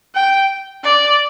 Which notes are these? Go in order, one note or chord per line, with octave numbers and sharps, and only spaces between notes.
G5
D5